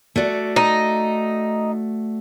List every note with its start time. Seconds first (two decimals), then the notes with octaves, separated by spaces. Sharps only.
0.16 A3 F#4 D5
0.56 D#4